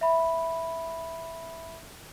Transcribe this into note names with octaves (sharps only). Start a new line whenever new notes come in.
E5 B5